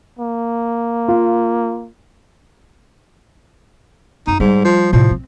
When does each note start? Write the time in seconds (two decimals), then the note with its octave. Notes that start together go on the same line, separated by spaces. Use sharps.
0.19 A#3
1.08 F4
4.27 F#2 C4 D#4
4.40 G#2 G3
4.64 F3
4.93 A2 C3 F3
5.11 C4